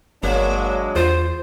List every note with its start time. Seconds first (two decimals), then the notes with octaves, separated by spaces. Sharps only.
0.23 G1 F#3 G#3 A#3 D4 C#5
0.96 E2 F4 C5